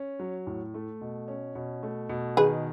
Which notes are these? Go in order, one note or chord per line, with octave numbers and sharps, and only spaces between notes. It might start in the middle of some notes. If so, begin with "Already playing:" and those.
Already playing: C#4
F#3
A2
A3
B2
C#4
B2
A3
B2
D#3 G#4 B4